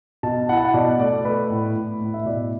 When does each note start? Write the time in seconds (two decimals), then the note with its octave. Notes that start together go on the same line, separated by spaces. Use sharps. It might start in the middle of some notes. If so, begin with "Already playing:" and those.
0.23 B2 A5
0.49 E4 F#5
0.57 A5
0.65 F#5
0.74 B2 D5
0.99 A3 D5
1.24 A3 B4
1.50 A2
1.76 A2
2.00 A2
2.14 E5
2.25 B2 D5